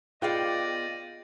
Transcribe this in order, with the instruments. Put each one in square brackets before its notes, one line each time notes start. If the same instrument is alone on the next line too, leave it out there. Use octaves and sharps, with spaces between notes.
[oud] B3 G#4 F5 [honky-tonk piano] F4 G5 [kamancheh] D5 [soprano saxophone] D#5